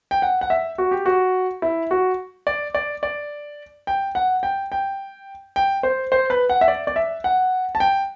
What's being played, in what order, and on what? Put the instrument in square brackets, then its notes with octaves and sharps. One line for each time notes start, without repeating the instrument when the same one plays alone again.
[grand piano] G5
F#5
F#5
E5
F#4
G4
F#4
E4
F#4
D5
D5
D5
G5
F#5
G5
G5
G5
C5
C5
B4
F#5
E5
D5
D5
E5
F#5
A5
G5